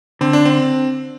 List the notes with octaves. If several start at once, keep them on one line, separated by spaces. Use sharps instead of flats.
D3 C4
D4
C4